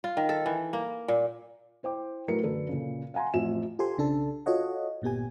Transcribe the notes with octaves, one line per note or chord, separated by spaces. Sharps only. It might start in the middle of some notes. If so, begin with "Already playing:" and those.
F4
D#3
A4
E3
A#3
A#2
E4 C5 G5 D6
A2 F#3 A3 A#4 B4 C#7
F#2 D3 A4 B4
A#2 C#3
F5 F#5 G#5 A#5 C6
A1 F2 F4 E5 E7
F4 G4 A4 C5 G#5 C6
B1 C#3 D4 A4 A5
F4 F#4 A4 C#5 D#5 F#5
G1 A#2 B3 G4 G#5